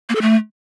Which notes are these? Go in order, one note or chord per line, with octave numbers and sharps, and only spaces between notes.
A#3
A4
A3